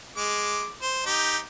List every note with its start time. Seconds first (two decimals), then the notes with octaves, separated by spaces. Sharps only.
0.17 G#3 D6
0.82 C5
1.06 D#4 G4